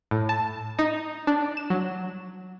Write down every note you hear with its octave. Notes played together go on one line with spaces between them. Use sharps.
A2
A5
D#4
D4
E7
F#3